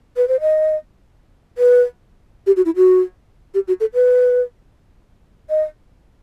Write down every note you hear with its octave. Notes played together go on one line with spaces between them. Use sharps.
B4
C5
D#5
B4
G4
F#4
E4
F#4
G4
F#4
A4
B4
D#5